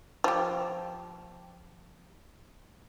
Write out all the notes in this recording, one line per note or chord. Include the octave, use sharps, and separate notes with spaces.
F3 G4